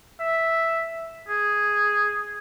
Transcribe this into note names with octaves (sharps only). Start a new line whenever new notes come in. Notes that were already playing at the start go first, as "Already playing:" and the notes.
E5
G#4